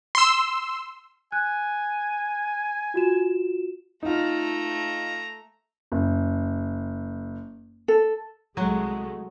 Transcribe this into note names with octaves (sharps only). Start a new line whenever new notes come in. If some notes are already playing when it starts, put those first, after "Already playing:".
C6 E6
G#5 F#6
F4 F#4 E7
A3 D#4 F4 A#5
F#1
A4
C2 F#3 G#3 A3 F#4